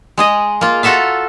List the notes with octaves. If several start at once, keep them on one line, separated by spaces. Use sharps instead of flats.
G#3 G#4 D#5
A#3 F4
F4 F#4 A4 E5 F5